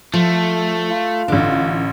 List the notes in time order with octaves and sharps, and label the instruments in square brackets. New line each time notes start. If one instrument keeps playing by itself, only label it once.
[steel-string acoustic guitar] F3 [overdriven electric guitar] A3
[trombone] F4
[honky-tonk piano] A1 D3 [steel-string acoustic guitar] D4